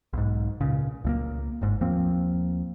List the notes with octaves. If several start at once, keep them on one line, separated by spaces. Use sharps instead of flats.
B1 G#2
C#2 A#2 C#3
C#2 A3 A#3
G1 G#2
D#2 F3 A#3 C4